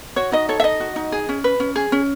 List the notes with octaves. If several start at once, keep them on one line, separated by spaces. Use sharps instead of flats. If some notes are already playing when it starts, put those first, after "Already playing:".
F#4 C#5
D#4 D#5
A4 C#5
E5
D#4 D#5
F#4
D#4
G#4
C#4
B4
C#4
G#4
C#4